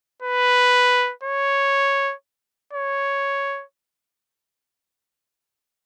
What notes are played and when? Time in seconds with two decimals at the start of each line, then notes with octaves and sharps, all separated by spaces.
0.22 B4
1.23 C#5
2.73 C#5